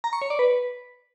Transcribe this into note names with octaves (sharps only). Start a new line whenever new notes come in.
A#5
C#6
C#5
D5
B4